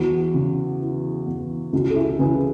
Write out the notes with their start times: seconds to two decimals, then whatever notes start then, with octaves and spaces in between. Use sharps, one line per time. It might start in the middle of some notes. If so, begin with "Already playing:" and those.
Already playing: E2 F#4
0.34 C#3
0.80 E3
1.26 E2
1.73 C#2 F#4
1.90 A4
1.96 E4 G#4
2.19 C#3 G#4 B4